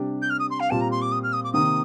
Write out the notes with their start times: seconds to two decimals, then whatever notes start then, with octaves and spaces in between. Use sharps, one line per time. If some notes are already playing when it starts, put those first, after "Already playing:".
Already playing: C3 G3 D4 G4
0.22 G6
0.30 F6
0.39 D#6
0.50 C6
0.60 F5
0.70 A#2 G3 C4 F4 A5
0.81 A#5
0.91 C6
1.02 D6
1.12 D#6
1.23 F6
1.33 D#6
1.44 D6
1.53 C3 D#3 A#3 D#6